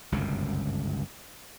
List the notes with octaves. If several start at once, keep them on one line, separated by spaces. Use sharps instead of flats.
G1 C#2 F#2 C3